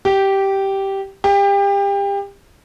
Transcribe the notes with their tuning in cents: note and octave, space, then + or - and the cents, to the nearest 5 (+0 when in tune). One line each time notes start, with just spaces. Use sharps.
G4 -10
G4 +30